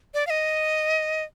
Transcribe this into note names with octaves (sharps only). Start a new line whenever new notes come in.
D5
F5
D#5